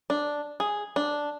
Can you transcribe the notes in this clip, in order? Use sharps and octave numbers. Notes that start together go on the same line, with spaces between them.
D4
G#4
D4